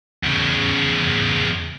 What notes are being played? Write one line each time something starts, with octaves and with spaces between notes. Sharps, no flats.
E2 C#3